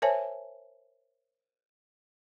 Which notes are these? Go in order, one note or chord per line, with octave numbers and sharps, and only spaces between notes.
A#4 C5 C#5 E5 G#5 A5